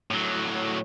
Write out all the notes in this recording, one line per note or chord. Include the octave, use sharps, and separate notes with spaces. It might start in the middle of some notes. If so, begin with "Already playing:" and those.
A2 F#3